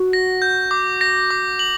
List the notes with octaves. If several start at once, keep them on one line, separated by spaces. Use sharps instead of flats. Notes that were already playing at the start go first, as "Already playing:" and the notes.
Already playing: F#4
A#6
G6
D6
A#6
D6
F#7